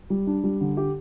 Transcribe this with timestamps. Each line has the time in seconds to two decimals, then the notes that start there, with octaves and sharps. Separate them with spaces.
0.10 G3
0.27 D4
0.44 G3
0.61 D3
0.77 G4